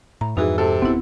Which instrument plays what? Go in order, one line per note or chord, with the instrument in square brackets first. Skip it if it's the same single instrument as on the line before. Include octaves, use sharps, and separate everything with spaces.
[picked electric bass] A2 [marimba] A#5
[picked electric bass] F2 G#2 [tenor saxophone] E3 [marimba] D#4 F#4 G#4
[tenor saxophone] C3 [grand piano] A4
[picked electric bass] D1 E2 B3 [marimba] C4 E4